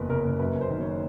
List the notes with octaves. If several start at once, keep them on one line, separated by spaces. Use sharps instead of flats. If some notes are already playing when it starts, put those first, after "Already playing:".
Already playing: F#1 E2 B4
C#3 A#4
F#1
F#2 B4
F#1
C5
D#3
C#5